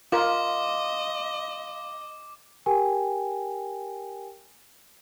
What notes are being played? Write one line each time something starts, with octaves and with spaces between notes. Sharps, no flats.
F4 A#4 D#5 F5 C6 D6
G4 A#4 G5 G#5